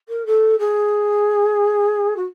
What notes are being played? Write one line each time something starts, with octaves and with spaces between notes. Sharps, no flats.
A#4
A4
G#4
F#4